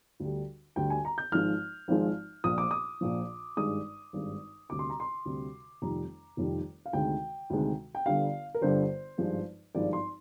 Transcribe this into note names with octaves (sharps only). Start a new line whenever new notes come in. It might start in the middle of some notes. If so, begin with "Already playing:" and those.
D2 D3 G3
D2 D3 G3 G5
G#5
A#5
G6
G#1 G#2 F3 G#3 F6
G#1 G#2 F3 G#3
A#1 A#2 F3 D#6
D6
D#6
A#1 A#2 F3
G#1 G2 D#3 G#3 D#6
G#1 G2 D#3 G#3
D2 C3 G3 D6
C6
A#5
C6
D2 C3 G3
F1 F2 D#3 G3 A#5
F1 F2 D#3 G3
F5
D2 C3 D#3 G#3 G5
D2 C3 D#3 G#3
G5
G1 G2 D3 G3 F5
A#4
G1 G2 D3 G3 C5
G#1 G2 F3 G#3
G#1 G2 F3 G#3 D5
C6